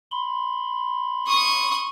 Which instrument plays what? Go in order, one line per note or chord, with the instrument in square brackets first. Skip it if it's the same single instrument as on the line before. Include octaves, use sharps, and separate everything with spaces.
[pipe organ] B5 C6
[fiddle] C#6 D#6